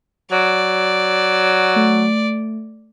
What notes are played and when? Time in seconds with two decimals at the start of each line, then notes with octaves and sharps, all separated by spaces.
0.32 F#3 D5
1.76 A3